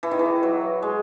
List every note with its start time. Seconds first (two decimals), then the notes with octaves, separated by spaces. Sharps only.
0.03 E3
0.11 D#3
0.19 E3
0.43 F#3
0.82 G#3